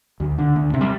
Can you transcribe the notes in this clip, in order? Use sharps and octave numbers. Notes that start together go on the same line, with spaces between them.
D2
D3
D2
C3
G3